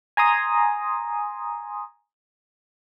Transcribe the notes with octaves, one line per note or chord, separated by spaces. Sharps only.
G#5 A#5 C6 D#6